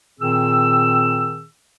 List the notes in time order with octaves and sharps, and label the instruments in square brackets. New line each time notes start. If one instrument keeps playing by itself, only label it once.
[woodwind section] A#2 D#3 C4 G#4 E6